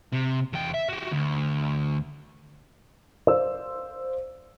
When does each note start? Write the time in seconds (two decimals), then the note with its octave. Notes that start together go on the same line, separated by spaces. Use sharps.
0.12 C3
0.53 E2 G5
0.74 E5
0.89 F#4 G4
1.11 D2
3.27 C5 D5 F5 E6